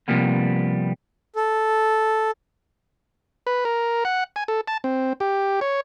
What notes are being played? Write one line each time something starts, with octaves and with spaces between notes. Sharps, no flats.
C3 D#3 F3 G3 A#3 B3
A4
B4
A#4
F#5
G#5
A4
A5
C4
G4
C#5